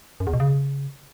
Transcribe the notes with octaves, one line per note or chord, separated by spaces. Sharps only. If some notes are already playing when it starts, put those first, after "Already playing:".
F#2
E2
B2
C#3